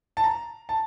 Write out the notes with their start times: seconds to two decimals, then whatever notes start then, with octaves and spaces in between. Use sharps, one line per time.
0.17 A5
0.24 A#5
0.69 A5